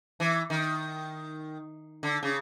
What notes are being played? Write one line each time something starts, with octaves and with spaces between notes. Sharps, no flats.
E3
D#3
D3
C#3